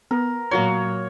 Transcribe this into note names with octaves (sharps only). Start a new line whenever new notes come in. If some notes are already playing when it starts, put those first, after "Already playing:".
B3 A#4
A#2 F#3 A#3 F#4 C#5 C6